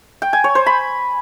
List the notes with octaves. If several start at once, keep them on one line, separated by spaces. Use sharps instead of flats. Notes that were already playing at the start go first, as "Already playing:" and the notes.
G5
G#5
C#5
C5
B5